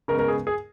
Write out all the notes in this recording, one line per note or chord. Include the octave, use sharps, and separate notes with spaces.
C#3 G#3 B3 A#4
A#4
G#4
G#4